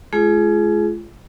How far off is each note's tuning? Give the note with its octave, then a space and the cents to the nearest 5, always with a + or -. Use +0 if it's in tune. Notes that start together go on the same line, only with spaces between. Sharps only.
G#3 +40 F4 -30 G#4 +15